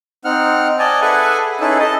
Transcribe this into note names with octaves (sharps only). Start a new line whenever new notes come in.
C4 D#4 F#5 F6
D5 D#5 G#5 A5
G#4 A4 B4 E5 F#5 G#5
C#4 D#4 E4 G#4 A4 B4
A4 D#5 A5